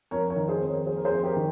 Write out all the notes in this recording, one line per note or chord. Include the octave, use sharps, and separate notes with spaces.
F2 A#4 C#5
A#4 C#5
D#3
G#4 C5
F2
A#4 C#5
A#3 G#4 C5
A#4
G#4 C5
F2
G4 A#4
D#3